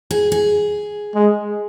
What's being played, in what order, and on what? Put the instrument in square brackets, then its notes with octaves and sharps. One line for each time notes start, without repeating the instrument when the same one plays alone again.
[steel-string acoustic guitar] G#4
G#4
[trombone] G#3